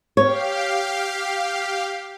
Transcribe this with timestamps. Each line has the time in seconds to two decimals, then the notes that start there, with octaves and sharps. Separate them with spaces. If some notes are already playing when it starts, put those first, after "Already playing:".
0.17 G4 C#5 F5